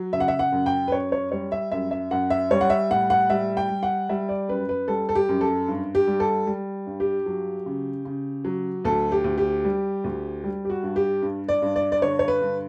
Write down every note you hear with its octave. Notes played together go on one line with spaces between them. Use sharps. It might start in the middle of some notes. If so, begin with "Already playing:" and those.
Already playing: F#3
C#3 E5
F#5
E5
F#5
F#2
G5
B4
F#2 C#5
C#5
G3 C#5
E5
F#2 E5
E5
F#2 F#5
E5
G3 C#5
F#5
E5
A2 F#5
F#5
G3 E5
G5
G3
F#5
G3 E5
D5
F#2 B4
B4
G3 A4
A4
G4
F#2
A4
G2
G4
G3
A4
G3
G2
G4
F#3
C#3
C#3
F#3
D2 A4
G4
D2
G4
G3
D2
G3
G4
F#4
G2
G4
G2
D5
G2
D5
D5
D3 C#5
C#5
B4
G2